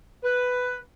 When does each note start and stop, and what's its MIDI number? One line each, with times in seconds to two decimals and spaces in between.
0.23 0.75 71